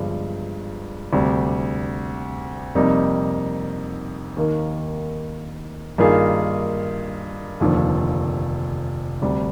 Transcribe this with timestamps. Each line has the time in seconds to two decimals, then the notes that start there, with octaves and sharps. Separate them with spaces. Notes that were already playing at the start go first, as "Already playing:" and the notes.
Already playing: G1 G2 F3 G#3
1.13 D2 C3 G3
2.75 F2 C3 G3 A#3 D#4
4.37 D#2 D#3 A#3
5.98 G2 D#3 A#3 F4 G#4
7.60 F1 D#2 D3 F3
9.22 D2 C3 G3